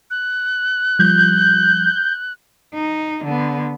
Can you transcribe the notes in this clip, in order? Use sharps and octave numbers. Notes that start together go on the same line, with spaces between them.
F#6
F3 G3 G6
D#4
D3 B3